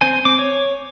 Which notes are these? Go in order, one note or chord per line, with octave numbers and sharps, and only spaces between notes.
C4 C5 G#5
C4 D6
C#5